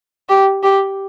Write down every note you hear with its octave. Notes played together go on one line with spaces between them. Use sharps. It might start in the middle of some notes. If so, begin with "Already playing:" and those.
G4
G4